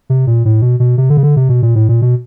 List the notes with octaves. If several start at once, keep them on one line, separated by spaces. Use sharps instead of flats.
C3
A#2
A2
B2
B2
C3
D3
C#3
D3
C3
B2
A#2
A2
A#2
B2